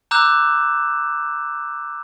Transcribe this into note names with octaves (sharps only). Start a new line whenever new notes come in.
A#5 D6 E6 F#6 G6 E7